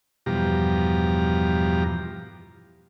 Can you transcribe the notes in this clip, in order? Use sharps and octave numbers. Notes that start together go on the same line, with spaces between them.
E2 G2 B2 F3 G4 A#5